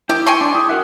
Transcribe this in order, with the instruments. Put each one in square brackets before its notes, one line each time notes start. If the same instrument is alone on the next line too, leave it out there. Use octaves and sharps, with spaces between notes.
[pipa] D#3 G4 [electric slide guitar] E4 [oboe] G5
[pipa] G5 G#5 C6 [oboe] C#6
[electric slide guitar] D4 [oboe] D5
[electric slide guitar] E4 [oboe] G#4
[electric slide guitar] F#4 A#4 E5 [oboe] F#5